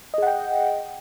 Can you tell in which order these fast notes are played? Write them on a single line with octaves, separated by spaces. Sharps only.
D#5 G#4 F#5 G5